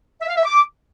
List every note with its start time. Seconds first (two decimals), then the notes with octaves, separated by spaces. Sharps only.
0.20 E5
0.28 F5
0.36 E5
0.44 D6